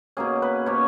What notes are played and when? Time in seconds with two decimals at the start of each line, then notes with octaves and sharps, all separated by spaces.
0.17 B2 A#3 C#4 G#4
0.42 B4
0.66 B2 A#3 C#4 C#5